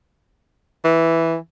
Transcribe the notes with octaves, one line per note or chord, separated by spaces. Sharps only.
E3